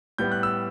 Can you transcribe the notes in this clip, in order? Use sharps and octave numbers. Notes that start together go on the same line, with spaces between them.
A2 G3 B3 G6
F#6
E6